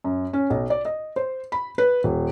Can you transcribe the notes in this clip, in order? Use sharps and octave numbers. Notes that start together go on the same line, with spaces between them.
F#2
C#4
B1
D5
D#5
C5
B5
B4
D#1